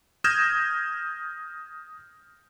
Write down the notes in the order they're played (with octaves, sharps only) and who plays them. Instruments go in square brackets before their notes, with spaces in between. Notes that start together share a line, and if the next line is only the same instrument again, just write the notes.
[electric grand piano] D#6 F6 G6 G#6 A#6 E7